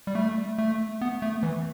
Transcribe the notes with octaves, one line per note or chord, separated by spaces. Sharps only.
G3
A3
A3
B3
A3
E3